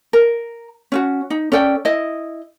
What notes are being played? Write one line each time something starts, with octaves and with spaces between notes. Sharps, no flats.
A#4
C#4 F4 F#4
D#4
C#4 A4 D5 G5
E4 D#5